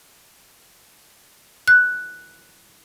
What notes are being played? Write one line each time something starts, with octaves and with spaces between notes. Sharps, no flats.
F#6